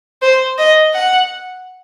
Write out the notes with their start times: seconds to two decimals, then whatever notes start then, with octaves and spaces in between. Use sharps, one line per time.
0.22 C5
0.58 D#5
0.94 F#5